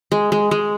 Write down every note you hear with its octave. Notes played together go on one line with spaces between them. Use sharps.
G#3
G#3
G#3